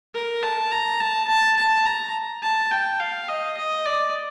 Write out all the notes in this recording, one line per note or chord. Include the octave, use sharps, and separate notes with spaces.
A#4
A5
A#5
A5
A5
A5
A#5
A5
G5
F5
D#5
D#5
D5